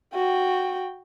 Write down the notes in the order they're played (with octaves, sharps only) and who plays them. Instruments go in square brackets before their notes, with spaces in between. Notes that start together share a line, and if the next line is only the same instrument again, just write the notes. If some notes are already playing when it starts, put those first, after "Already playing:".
[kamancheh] F#4 G5